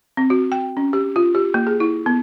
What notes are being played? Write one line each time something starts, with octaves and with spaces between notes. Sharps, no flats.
C4
F#4
G5
C#4
G4
F4
G4
A#3
G#4
E4
B3